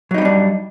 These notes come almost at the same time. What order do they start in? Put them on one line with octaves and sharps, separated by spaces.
F#3 D#4 G3 C4 D4